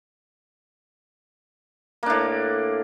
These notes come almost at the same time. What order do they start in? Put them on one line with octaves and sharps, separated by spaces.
A#3 D4 A2